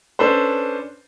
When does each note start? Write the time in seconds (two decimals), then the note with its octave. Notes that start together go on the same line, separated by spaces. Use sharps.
0.19 C#4 D4 A4 B4 C5